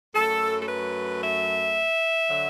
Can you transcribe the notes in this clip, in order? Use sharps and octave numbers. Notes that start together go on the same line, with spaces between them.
F#2 F#3 A3 A4
A4
B4
E5
D3 F#3